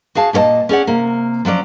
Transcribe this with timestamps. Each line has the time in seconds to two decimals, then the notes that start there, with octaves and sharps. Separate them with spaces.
0.15 F#4 G#4 F5 A5
0.33 A#2 G4 C#5 D#5 A5
0.69 C#4 G#4 D5 F#5
0.87 C3 A#3
1.45 F3 F#3 C#4 D5